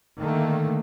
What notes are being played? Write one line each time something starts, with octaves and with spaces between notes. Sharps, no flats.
D3 D#3 A3 A#3